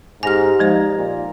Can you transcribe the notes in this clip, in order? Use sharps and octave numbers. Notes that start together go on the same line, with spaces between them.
G#2 G4 G#5 F6 A#6 F7
F3 G#3 D#4 C5
A#2